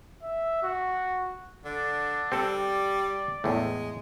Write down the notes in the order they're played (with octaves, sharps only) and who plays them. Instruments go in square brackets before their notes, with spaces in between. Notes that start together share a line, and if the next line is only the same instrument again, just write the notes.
[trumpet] E5
F#4
[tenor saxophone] D3 [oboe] D4
[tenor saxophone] G3 [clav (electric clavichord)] C4 A4
[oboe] D5
[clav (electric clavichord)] E2 A2 [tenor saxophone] G#3